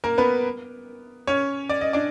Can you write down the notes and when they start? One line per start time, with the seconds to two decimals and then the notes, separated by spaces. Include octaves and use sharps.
0.04 A#3 A#4
0.18 B3 B4
1.27 C#4 C#5
1.69 D5
1.81 D#5
1.93 D4 D5